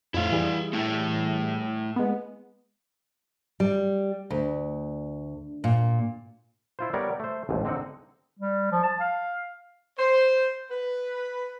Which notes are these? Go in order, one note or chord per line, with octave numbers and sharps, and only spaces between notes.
F2 A2 E4 F5
E3 G3 G#4
A3 E4
G#3 B3
G3
D2
A#2
E4 F4 C5
G3 B3 A#4 C#5 D5
A3 C5
A1 D#2 G#2
D3 C4 D#4 F#5
G3
F3
A5
F5
C5
B4